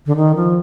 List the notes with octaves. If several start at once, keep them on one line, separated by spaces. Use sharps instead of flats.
D3
D#3
F3